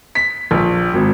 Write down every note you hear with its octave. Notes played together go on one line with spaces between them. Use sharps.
B6
A#1
G#1